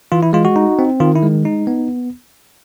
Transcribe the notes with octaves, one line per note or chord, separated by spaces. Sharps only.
E3 F4
E4
G#3 F4
F#4
D#4
C4
D#3 F4
E4
G#3
D#4
B3